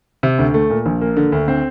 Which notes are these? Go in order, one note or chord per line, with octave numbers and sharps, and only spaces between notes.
C3
D2
A3
A#2
A#1
A#3
D3
D2
C4